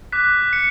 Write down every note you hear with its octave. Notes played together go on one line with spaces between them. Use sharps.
D6 F#6 B6
C#7